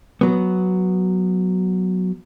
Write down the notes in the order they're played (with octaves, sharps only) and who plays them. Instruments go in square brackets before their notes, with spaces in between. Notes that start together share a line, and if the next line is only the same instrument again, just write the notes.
[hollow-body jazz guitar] F#3 B3